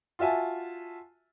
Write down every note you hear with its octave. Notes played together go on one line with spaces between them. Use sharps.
F4 F#4 E5 G#5 A5